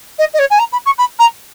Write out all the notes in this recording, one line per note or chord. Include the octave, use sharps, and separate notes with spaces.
D#5
D#5
C#5
G#5
A#5
B5
C#6
B5
A#5